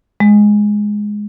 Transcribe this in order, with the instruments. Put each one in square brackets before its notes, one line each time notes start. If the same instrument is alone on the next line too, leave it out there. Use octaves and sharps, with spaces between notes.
[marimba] G#3